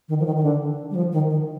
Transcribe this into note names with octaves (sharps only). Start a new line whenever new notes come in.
D#3
F3
D#3
D#3
D3
G3
F3
D#3
D#3